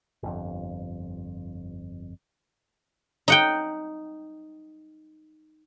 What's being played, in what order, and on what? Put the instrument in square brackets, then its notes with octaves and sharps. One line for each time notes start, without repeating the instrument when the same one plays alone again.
[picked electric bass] G1 F2
[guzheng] D#4 F#5 G5